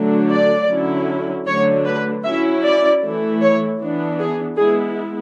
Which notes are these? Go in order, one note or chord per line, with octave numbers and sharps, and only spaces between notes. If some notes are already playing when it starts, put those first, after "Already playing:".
Already playing: D3 F#3 A3 D4
D5
D3 F#3 C#4 E4
D3 F#3 A3 D4 C#5
B4
F#3 C#4 E4 E5
D5
E3 A3 E4
C#5
E3 B3 D4
G#4
G#3 B3 E4 G#4